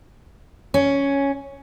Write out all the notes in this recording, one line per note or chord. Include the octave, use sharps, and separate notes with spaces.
C#4